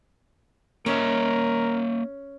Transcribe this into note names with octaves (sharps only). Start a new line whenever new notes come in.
A#3 C#4 A#4 D#5 E5